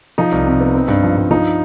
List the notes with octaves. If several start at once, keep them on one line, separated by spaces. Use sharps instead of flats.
F3 D#4
C2
C3
B3
C4
G2
F3
G2
F3 D#4